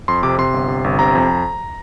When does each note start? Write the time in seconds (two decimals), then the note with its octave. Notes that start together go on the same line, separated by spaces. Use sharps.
0.08 F2 C6
0.23 C3 D6
0.38 C3 C6
0.54 G1
0.68 C3
0.84 G1
0.99 C3 A#5
1.15 F2